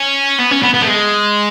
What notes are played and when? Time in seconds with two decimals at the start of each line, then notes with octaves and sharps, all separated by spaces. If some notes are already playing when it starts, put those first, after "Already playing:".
Already playing: C#4
0.39 B3
0.51 C#4
0.63 B3
0.74 B3
0.82 A3
0.86 G#3